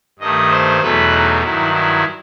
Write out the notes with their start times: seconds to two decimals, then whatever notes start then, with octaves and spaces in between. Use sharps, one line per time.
0.19 G2 D#3 A3 D#5
0.50 C5
0.81 E2 B2 F#3 A3 B4
1.11 D#4
1.42 G2 D#3 F#3 E4
1.73 E4